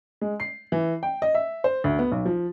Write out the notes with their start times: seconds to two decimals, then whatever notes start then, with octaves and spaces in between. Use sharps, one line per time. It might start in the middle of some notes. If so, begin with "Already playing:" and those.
0.21 G#3
0.40 C7
0.72 E3
1.03 G5
1.22 D#5
1.35 E5
1.64 C5
1.84 D2
1.99 B3
2.12 B1
2.25 F3